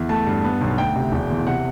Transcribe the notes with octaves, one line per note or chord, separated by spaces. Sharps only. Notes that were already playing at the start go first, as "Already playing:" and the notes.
Already playing: E2
A3 A5
G2
B3
B1
D2 G5
C3
E1
E2
C3 F#5